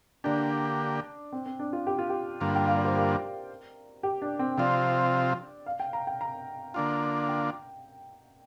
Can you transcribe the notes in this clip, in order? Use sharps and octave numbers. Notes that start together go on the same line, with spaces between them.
D3 A#3 D4 G4
C4
C4
D4
F4
G4
F4
G4
G2 D3 A#3 F4
G5
F5
D5
C5
A#4
G4
D4
C4
C3 F3 C4 F4 D5
F5
G5
A#5
G5
A#5
D3 A#3 D4 F4
G5